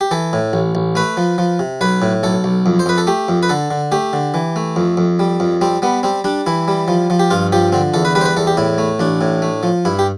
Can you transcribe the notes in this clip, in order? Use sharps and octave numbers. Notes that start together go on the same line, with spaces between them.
G4
E3 A4
A2
A1
A1
A3 B4
F3
F3
C3
B1 B4
A2
B1 A4
B1
F2
C5
F2 B4
A4
A3 G4
F2
B4
D3 A4
D3
A3 G4
D3
E3
A3
F2
F2
G3
F2
G3 C4
G3 B3
G3 C4
G3 D4
E3 E4
G3
F3
F3
G4
G2 F4
F3 G4
D3 C4
E2 A4
B4
G3 B4
C5
B4
E2 A4
G4
A2 E4
A3
A1 D4
A2
A3
F3
G2 E4
G4